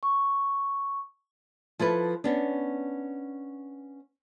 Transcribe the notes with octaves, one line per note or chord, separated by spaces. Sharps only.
C#6
F3 E4 A4 B4
B3 C#4 D4